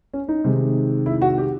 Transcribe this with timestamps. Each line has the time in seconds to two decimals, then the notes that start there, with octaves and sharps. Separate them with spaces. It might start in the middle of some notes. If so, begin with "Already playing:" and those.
0.14 C#4
0.28 D#4
0.44 C3 D#3 G#3
1.06 E4
1.22 F#4
1.38 G4